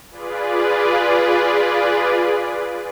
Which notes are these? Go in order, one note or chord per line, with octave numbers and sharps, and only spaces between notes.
F4 G#4 B4 D5